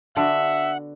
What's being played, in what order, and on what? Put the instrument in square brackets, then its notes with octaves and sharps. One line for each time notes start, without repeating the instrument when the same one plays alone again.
[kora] D3 B3 F#4 [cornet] E5 [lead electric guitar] F#5